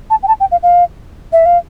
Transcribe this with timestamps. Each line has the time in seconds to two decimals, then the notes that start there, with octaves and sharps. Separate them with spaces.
0.10 A5
0.23 G5
0.28 A5
0.40 G5
0.52 F5
0.63 F5
1.33 E5
1.46 F5